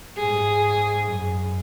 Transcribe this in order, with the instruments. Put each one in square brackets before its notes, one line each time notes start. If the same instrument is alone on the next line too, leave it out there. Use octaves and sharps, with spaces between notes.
[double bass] G#2 [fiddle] G#4
[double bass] F#2